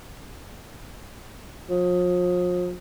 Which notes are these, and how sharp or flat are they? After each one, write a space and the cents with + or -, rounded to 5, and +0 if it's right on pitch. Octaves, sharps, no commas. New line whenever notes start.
F3 +40